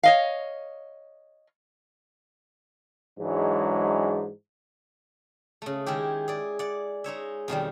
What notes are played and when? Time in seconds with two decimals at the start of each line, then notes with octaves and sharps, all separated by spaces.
0.03 C#5 D#5 F5
3.18 G#2 E3 F#3 G#3 D4
5.62 C#3 A3
5.86 D#3 G#3 E4 G4
6.28 G#4 D5
6.59 D5 F#5
7.04 G#3 D#4 C#5 E5
7.48 F2 B2 D#3 G3